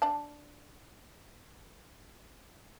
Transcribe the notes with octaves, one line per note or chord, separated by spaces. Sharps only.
D4 D5 A5